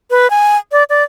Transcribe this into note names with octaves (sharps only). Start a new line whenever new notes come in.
B4
G#5
D5
D5